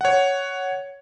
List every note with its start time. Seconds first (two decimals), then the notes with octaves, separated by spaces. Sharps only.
0.01 C#5 F#5